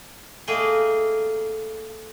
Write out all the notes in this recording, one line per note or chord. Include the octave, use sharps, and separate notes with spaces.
A3 A#3 G#4 D#5 G5